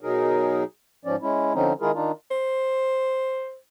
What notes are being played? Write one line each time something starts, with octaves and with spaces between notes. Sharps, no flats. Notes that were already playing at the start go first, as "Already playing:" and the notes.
B2 F#3 D#4 G#4 A#4
G#2 F3 C#4 D5
G#3 C#4 E4
D3 F3 C4 C#4 D#4
D#3 G#3 E4 F4 G#4 A#4
D#3 D4 D#4 F4
C5